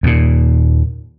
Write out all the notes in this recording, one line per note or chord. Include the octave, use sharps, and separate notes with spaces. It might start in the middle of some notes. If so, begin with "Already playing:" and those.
D#2 A#2